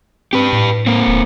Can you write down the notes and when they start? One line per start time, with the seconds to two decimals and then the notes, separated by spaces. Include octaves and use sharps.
0.33 C4 G4 B4
0.53 A2
0.86 A#3 C4
1.08 D#1